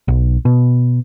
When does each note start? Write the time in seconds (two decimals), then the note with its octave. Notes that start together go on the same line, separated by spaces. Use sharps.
0.08 B1
0.45 B2